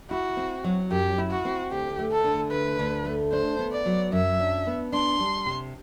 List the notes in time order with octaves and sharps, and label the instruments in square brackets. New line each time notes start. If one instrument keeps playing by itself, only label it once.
[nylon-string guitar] E4 [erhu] F#4
[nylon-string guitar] C4
F#3
[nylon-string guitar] F#2 [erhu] G4
[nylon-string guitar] E4
[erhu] F#4
[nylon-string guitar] C4
[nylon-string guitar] D2 [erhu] G4
[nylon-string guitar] A3
[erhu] A4
[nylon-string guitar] D3
[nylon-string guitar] D2 [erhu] B4
[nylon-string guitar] D2
A3
[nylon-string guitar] D4 [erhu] C5
[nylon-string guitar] B3
[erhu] D5
[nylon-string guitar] F#3
[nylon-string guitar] F#2 [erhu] E5
[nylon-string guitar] D4
B3
[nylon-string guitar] D4 [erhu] C6
[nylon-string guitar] G3
C3